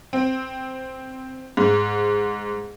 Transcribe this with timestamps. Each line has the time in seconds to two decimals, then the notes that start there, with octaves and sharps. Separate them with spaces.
0.13 C4
1.57 G#2